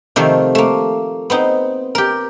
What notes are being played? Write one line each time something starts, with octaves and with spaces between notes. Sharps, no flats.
C3 D#3 F3 A3
A3 A#3
B3 C4 D#4
G4 A#4